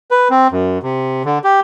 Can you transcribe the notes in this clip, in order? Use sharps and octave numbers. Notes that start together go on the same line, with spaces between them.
B4
C4
F#2
C3
D3
G4